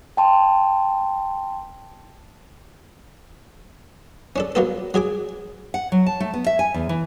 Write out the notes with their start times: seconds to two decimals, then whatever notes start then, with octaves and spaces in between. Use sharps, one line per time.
0.17 G5 A5 C6
4.36 C#4 D4 A4
4.55 F#3 A#3 B3 A4
4.94 F#3 G#4 G#5 D6
5.74 F#5
5.92 F#3
6.06 A5
6.20 A3
6.34 B3
6.46 E5
6.59 G#5
6.74 E2
6.89 E3